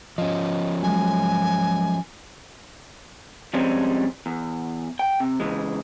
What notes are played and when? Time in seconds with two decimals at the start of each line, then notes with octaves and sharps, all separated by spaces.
0.18 F3 C#4 D#5
0.83 F#3 G#3 G#5
3.54 F3 G3 G#3 C4 C#4
4.26 E2
4.99 G5
5.20 C3
5.40 C#3 E3 G#3